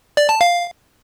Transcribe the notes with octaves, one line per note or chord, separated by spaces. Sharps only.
D5
A5
F5